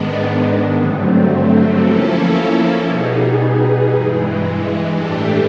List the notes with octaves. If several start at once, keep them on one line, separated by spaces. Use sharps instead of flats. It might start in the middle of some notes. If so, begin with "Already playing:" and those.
Already playing: G#2 D#3 G#3 B3 D4
G2 D3 F#3 A3 C4
F3 A#3 C#4 E4 A4
B2 G3 B3 D#4 G#4
G2 E3 G#3
A2 E3 A3 D4 G4